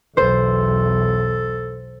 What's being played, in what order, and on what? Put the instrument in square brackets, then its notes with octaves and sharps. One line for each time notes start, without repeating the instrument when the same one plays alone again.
[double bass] B1 E2 [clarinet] A4 [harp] C5